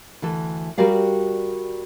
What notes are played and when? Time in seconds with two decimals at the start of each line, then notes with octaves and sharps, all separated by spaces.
0.22 D2 E3 A4
0.78 G3 F#4 G4 A#4 D5 F5